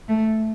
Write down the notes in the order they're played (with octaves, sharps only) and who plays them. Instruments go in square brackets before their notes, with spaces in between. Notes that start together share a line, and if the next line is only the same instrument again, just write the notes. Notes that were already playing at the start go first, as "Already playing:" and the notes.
[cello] A3